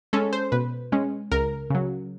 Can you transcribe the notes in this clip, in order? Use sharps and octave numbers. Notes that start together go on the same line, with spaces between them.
G#3 C#4 A4
C5
B2 B4
G#3 C#4
C#2 A#4
C#3 F#3